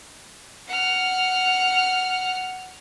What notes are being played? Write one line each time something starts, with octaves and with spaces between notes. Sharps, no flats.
F#5 F6